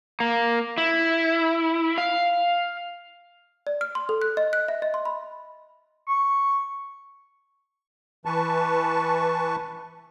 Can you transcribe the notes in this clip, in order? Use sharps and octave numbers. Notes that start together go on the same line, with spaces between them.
A#3
E4
F5
D5
F6
C6
A4
F#6
D#5
F#6
E5
D#5
C6
B5
C#6
E3 B4 A5 C#6